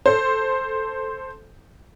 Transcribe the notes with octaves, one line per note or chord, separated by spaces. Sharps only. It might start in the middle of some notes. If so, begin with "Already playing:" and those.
A4 C5